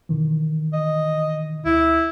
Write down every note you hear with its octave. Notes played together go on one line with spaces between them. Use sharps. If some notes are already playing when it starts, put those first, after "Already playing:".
B2 D#3 E3
D#5
D2 E4